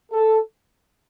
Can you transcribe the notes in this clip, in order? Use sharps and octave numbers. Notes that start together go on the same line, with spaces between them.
A4